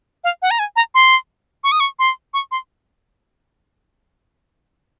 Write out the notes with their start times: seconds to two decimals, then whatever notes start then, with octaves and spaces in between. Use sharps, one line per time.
0.24 F5
0.42 F#5
0.51 A#5
0.59 G#5
0.76 A#5
0.94 C6
1.64 C#6
1.72 D#6
1.80 C#6
1.99 C6
2.34 C#6
2.51 C6